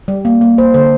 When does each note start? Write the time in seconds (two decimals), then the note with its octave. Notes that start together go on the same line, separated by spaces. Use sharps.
0.08 G3
0.25 A#3
0.41 A#3
0.58 A#3 C5
0.74 D3 C5